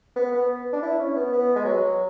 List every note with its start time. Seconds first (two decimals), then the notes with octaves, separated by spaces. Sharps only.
0.16 B3
0.32 B3
0.73 D4
0.82 E4
0.99 C#4
1.16 B3
1.32 B3
1.56 G#3
1.65 F#3